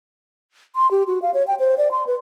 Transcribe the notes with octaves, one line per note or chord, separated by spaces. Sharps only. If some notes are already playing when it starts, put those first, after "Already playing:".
C6
G4
F#4
F5
C#5
G5
C5
D5
C6
B4